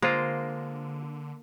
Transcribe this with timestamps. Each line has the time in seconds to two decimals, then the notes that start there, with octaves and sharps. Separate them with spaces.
0.02 D3 G#3 A#3 F4 C5